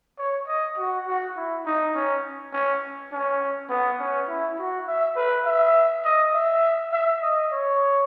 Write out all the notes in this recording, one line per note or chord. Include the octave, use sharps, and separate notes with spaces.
C#5
D#5
F#4
F#4
E4
D#4
C#4
C#4
C#4
B3
C#4
E4
F#4
E5
B4
E5
D#5
E5
E5
D#5
C#5